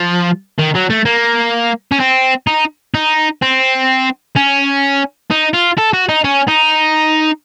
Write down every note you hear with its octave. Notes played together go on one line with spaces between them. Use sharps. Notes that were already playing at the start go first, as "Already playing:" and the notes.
Already playing: F3
D#3
F#3
A3
A#3
C#4
C4
D#4
D#4
C4
C#4
D#4
F4
A4
F#4
D#4
C#4
D#4